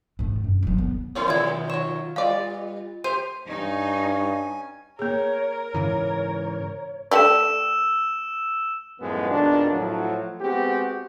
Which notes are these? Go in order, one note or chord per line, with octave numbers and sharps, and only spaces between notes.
G#2 A3
F#2
D#1 F#3
B3
G3 A3 C#4 E4 A#4 C5 C#5
B2 D#3 F#3 B3 F4 D5 G#6
F#3 C#5 E7
G3 B3 D5 F5
G4 C5 D#7
G2 C#4 D#4 G#5 C#6
A#3 G#4 A#4 C#5
G#2 C#3 E3 C#5
A3 G4 D5 E6 E7
F#2 A2 D#3 F3 G#3 B3
G#1 F2 B2 D#3 D4
A2 F3 F#3
G#3 B3 C4 F#4 G4